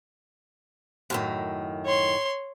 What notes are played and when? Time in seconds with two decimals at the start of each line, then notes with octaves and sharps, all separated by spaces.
1.10 F#2 A2 D#3
1.86 C#5 C6